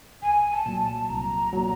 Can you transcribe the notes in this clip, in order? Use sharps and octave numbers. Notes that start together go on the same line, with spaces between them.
C2 G#5
A5
A#2 F#3
A5
C2 A#5
A#2 F#3